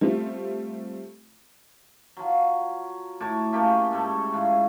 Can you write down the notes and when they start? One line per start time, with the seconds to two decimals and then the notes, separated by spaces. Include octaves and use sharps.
0.01 G3 A3 C4 F4
2.17 F3 F#3
3.20 A2 C#5 A5 D6
3.53 A3 A#3 C#4 G4
3.91 G#2 G3 A3
4.33 G#2 F3 E4